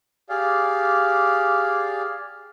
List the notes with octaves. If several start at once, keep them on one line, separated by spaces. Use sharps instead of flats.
G4 G#4 D5 F5